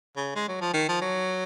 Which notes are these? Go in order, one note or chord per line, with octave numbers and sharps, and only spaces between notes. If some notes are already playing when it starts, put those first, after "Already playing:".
C#3
G#3
F#3
F3
D#3
F3
F#3